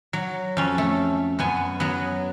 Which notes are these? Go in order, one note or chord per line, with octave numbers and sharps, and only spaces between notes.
F#3
F2 C#4
A3
F#2 B3 G#5
F#3 B3